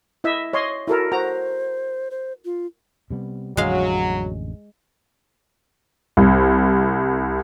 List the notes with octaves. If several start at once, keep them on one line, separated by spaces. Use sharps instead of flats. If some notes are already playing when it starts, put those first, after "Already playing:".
E4 D#5 E5
C#5 D#5 C6
E4 F#4 A4 A#4
F#4 C5 A#5
C5
F4
C3 G3 B3
A1 F2 D3 F#3 G#3 F5
C2